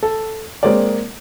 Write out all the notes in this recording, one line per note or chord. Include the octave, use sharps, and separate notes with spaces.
A4
G#3 A#3 C4 C#5 D5